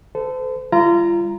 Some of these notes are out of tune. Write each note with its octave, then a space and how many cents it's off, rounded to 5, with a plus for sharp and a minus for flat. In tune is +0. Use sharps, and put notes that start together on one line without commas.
A4 +0 C5 -40
G3 +20 F4 -35 A#5 +0